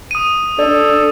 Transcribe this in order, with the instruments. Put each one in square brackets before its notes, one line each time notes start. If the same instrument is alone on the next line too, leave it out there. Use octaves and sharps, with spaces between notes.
[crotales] D#6 D#7
[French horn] D4 [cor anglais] A4 [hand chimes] D5